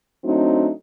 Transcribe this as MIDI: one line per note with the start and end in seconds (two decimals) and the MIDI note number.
0.24 0.71 54
0.24 0.71 57
0.24 0.71 60
0.24 0.71 62
0.24 0.71 63